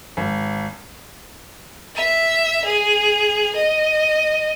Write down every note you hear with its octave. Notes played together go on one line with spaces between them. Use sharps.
G#1
E5
G#4
D#5